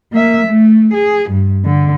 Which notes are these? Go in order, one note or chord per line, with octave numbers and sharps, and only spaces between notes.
A#3 E5
A3
G#4
G2
D3